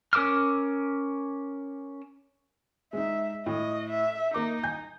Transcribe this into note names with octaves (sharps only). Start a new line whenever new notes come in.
C#4 A#4 D6 E6 F6
G#3 D#4 E5
A2 D#5
E5
A#3 D#4 D6
G#5 G6